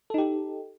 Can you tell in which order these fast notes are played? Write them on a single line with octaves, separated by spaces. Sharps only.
A4 D#4 G4